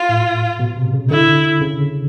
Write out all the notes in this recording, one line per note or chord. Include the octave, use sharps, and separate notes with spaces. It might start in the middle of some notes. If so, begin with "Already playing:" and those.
Already playing: F4
A2
B2
C3
C#3
D3 E4
C#3